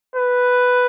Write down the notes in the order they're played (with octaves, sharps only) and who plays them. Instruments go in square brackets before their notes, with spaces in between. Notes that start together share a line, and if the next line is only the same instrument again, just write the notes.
[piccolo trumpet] B4